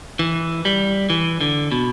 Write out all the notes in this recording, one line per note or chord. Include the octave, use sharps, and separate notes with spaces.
E3
G3
E3
D3
B2